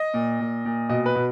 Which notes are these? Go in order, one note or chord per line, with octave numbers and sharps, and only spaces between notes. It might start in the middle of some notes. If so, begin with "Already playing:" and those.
Already playing: D#5
A#2
A#2
A#2
B2 D#5
B4
B2